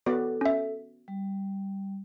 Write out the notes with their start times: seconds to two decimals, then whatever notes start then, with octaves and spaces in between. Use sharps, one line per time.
0.06 B3 F#4 A4 D5
0.41 C#4 E5
1.08 G3